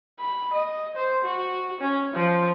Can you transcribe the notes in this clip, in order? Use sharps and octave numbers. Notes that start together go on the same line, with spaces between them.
B5
D#5
C5
F#4
C#4
F3